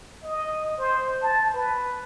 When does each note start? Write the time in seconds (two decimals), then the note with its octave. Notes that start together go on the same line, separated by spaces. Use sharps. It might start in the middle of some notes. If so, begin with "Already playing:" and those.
0.23 D#5
0.78 C5
1.22 A5
1.54 B4